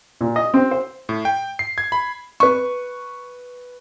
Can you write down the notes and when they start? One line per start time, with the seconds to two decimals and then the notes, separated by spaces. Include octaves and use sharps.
0.21 A#2
0.36 D#5
0.54 C4
0.71 C5
1.09 A2
1.25 G5
1.59 C7
1.78 G#6
1.92 B5
2.40 B4 C#6